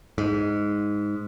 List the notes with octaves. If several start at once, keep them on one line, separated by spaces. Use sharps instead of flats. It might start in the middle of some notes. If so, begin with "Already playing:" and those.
G#2